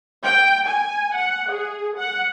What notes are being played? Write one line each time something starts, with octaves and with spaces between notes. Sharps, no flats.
G5
G#5
F#5
G#4
F#5